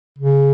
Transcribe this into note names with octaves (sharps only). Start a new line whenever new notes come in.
C#3